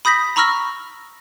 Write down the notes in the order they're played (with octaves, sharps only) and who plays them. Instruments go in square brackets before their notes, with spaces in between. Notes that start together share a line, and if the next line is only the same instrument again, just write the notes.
[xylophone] B5 D#6 G6 A#6 B6
A#5 B5 C#6 E6 F6 A#6